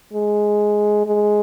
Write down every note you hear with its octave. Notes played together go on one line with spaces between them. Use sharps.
G#3
G#3